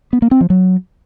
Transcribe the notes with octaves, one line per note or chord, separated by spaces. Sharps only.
B3
A#3
C4
F3
F#3